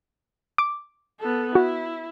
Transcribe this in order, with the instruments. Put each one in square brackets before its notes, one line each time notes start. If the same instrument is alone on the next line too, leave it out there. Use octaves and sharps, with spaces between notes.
[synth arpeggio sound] D6
[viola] B3 A4
[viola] E4 [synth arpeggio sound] F#4